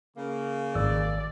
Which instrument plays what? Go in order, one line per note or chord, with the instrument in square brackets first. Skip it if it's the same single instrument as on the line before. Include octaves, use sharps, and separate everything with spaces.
[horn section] C#3 A#3
[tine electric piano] G#1 E6 [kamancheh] D5